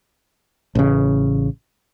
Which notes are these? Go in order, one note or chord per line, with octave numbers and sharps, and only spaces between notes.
A1 C#3